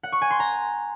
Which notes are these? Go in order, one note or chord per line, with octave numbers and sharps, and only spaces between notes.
F#5
C#6
G#5
C6
A#5